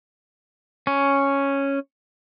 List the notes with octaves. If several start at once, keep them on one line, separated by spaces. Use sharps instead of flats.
C#4